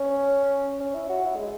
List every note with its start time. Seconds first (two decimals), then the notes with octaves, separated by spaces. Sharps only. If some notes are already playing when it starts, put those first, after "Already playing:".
Already playing: C#4
0.80 C#4
0.95 E4
1.10 F#4
1.26 E4
1.36 G#3